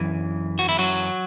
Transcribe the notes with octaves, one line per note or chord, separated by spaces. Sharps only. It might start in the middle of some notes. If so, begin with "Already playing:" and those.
Already playing: F#2 E3
F#4
E4
F#3 F#4